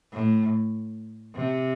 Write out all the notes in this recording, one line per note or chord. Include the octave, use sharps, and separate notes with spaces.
A2
C3